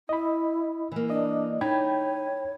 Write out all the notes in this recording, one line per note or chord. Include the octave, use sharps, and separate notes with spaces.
E4 D#5 B5
E3 A#3
D4 D5 D#5
D#4 C#5 G5 B5 G#6